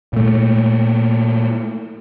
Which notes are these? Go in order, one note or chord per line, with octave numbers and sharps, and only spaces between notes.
A#2 A3